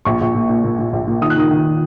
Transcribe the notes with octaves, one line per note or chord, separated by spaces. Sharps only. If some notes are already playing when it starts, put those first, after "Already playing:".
A#1 C#6
A#1
A#2
A#2
A#2
A#2
A#1
A#2
D#3 D#6
F#6
D#3 D#6
D#3